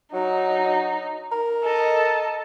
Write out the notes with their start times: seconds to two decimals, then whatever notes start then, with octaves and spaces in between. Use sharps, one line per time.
0.13 F#3 D#4
1.31 A#4
1.64 A4 D#5